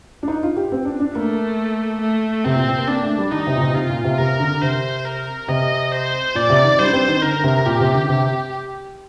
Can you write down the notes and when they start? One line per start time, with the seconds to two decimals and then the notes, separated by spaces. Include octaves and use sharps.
0.23 D4
0.28 D#4
0.43 F4
0.57 G4
0.72 C4
0.85 D4
1.00 D4
1.15 A3 A#3
2.01 A3
2.45 C3 C4
2.55 A#2
2.67 C3
2.78 A#3
2.88 A#3 D4
3.03 A3
3.18 G3
3.31 D#3 D#4
3.46 C3
3.56 A#2
3.61 C3
3.74 C3 F4
3.90 A#2
4.04 C3
4.19 C3 A#4
4.40 D3
4.62 C3 C5
5.05 A#4
5.48 C3 D#5
5.92 C5
6.35 A#2 D5
6.49 C3
6.64 D#3
6.79 G3 C5
6.86 D4
6.93 C4
7.08 D#3
7.23 D3 A#4
7.43 C3
7.66 A#2 G4
7.80 C3
7.95 D3
8.09 C3 G4